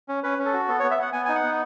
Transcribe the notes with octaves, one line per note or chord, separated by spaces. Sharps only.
C#4
C#4 B4
C#4
A4
F#4
B3 A4
C#5
B3
E5
B3 F#5
B3 G#5
D#4 G#5
F#5
B3